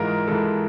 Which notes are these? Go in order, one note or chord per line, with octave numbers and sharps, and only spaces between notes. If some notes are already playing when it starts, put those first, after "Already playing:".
Already playing: G#2 E3 G#3 F4 A#4
G#2 E3 G#3 A4